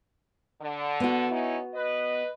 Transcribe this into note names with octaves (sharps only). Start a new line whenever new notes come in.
D3
B3 F#4
C#4 D#4 E4
B4 D#5